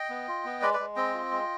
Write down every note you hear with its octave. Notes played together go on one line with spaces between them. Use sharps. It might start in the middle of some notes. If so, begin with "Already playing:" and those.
Already playing: D#5 G5
B3
F4
B3
G#3 B4 D5
B4 D5
G#3
C4 D#5 G5
F4
G#3